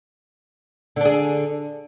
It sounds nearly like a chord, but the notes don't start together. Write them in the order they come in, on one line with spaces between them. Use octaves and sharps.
D3 D4 G#4